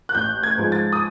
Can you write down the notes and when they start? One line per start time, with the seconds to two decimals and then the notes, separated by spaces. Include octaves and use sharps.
0.09 F#6
0.15 A1 G6
0.43 G#6
0.58 G#2 F3 G#3
0.72 A6
0.93 D#6